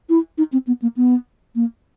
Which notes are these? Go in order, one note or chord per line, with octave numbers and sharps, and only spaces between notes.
E4
D#4
C4
B3
A#3
B3
A#3